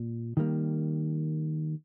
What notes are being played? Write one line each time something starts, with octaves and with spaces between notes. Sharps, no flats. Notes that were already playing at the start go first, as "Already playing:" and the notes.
Already playing: A#2
D#3 G3 A#3